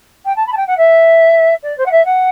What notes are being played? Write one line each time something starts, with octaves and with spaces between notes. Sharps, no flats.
G5
A5
B5
A5
G5
F#5
E5
D5
C5
F#5
E5
F#5